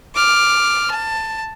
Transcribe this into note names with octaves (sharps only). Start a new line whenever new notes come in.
D6 F6
A5